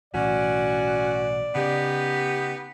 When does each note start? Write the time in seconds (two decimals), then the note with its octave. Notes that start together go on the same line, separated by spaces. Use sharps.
0.14 B1 A2 E3 C#4 F#4 D5
1.55 C#3 B3 D#4 G4